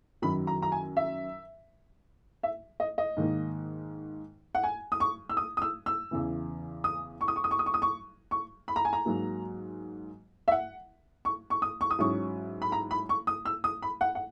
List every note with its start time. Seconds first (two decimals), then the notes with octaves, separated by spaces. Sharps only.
0.22 F#2 D#3 F#3 B5
0.47 A#5
0.62 A#5
0.72 G#5
0.97 E5
2.43 E5
2.80 D#5
2.98 D#5
3.17 G#2 D#3 A#3 D#4
4.55 F#5
4.63 G#5
4.92 D#6
5.00 C#6
5.30 E6
5.37 D#6
5.57 D#6
5.62 E6
5.86 E6
6.11 E2 C#3 E3
6.84 D#6
7.21 C#6
7.28 D#6
7.36 C#6
7.44 D#6
7.51 C#6
7.59 D#6
7.66 C#6
7.74 D#6
7.82 C#6
8.31 C#6
8.68 B5
8.76 A#5
8.85 G#5
8.93 A#5
9.05 G#2 F#3 A#3
10.48 E5
10.52 F#5
11.25 C#6
11.50 C#6
11.62 D#6
11.81 C#6
11.91 D#6
11.99 G#2 F#3 C#4 E4 C#6
12.62 B5
12.72 A#5
12.91 B5
13.09 C#6
13.27 D#6
13.45 E6
13.64 D#6
13.82 B5
14.01 F#5
14.15 F#5